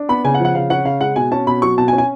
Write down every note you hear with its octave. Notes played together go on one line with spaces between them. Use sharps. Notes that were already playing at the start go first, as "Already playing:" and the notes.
Already playing: D4
B3 B5
C#3 G#5
F#5
F3
F#5
C#3 F5
C#4 F#5
C#3 F5
G#3 F#5
B2 G#5
C#4 A5
B2 B5
F#3 C#6
B2 A5
G#5
C#4
G#5